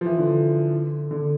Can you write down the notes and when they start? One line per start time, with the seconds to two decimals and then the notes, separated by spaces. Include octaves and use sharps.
0.01 F3
0.06 E3
0.18 D3
1.11 D3